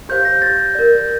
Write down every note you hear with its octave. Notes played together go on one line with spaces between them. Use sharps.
G4 C5 F5 G6
A#6
G4 A6
A#4 D5